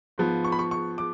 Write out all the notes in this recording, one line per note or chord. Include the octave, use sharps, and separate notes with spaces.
G#2 F3 B3
C#6
B5
C#6
C#6
D6